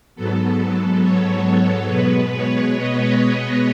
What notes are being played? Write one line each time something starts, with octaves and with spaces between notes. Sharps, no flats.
G#2 F#3 B3 A4
A4
C#5
B2 G#3 B3 B4
C#5
D#5
D#5